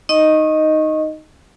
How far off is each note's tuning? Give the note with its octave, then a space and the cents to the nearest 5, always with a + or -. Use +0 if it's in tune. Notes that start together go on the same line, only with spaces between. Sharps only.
D#4 +0 D#5 +0 C#6 -25